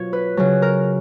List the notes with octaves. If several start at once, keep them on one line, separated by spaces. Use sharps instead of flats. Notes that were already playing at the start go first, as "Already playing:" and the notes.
Already playing: B2 F#3 F4 C#5
B4
C#3 F#3
A#4